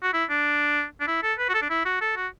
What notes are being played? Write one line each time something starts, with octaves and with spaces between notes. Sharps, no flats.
F#4
E4
D4
D4
E4
A4
B4
F#4
A4
D4
E4
F#4
A4
F#4